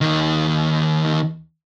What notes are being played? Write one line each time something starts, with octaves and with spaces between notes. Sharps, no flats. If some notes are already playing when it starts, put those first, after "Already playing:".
D#2 D#3